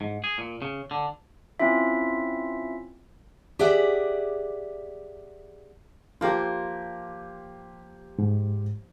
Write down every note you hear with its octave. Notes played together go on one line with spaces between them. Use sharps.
G#2
G#4
A#2
C#3
D3
C4 C#4 E4 F4 E5
G4 G#4 D5 E5 F#5
F3 A#3 F4 G4
G#2